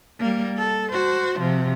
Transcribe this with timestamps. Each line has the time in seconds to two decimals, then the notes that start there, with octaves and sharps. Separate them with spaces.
0.20 G3 A#3
0.58 A4
0.92 F#4 C5
1.39 C3 F3